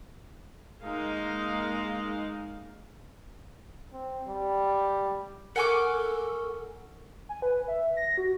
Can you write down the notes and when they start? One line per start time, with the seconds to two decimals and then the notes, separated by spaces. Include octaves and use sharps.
0.83 G#3 A#3 D#4 F5
3.93 C4
4.28 G3
5.56 A4 A#4 F#5 G#5 C#6 D6
7.29 G#5
7.42 B4
7.68 E5
7.97 A#6
8.18 F#4